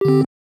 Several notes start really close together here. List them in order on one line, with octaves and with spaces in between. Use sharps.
G4 D3 C4